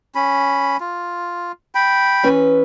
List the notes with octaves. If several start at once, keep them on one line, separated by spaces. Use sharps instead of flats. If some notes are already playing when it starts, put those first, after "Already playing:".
C#4 B5
F4
G5 B5
E3 C#4 B4